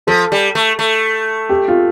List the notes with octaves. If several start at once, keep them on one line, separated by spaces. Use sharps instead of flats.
F3 A4
G3
A3
A3
G4
F4